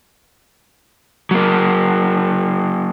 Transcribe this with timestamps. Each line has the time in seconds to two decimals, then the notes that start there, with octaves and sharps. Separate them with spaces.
1.31 F#3 A#3